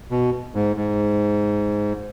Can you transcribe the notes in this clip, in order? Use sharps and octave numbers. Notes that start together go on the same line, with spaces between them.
B2
G#2
G#2